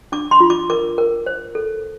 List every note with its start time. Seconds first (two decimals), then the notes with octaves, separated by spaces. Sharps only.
0.12 D4 D6
0.31 C6
0.40 F4
0.50 D6
0.70 A#4 D6
0.98 A#4
1.26 C5
1.55 A4